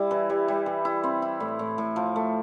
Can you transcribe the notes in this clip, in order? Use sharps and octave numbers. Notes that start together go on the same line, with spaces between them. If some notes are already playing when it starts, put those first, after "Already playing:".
Already playing: G3 E4
E3
G3
G3
E3
E4
C4
E4
A2
A2
A2
F3
A3